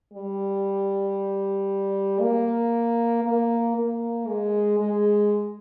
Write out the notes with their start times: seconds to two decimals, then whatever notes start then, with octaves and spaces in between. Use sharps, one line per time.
0.14 G3
2.20 A#3
3.24 A#3
3.76 A#3
4.28 G#3
4.80 G#3